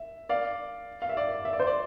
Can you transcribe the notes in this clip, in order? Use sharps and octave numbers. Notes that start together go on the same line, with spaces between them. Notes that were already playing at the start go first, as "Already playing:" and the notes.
Already playing: E5
D5 F5
F5
E5
D5
E5
D5
C5
D5